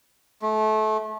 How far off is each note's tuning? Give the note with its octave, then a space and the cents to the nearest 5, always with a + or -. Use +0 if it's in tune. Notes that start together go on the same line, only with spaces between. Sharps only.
A3 -25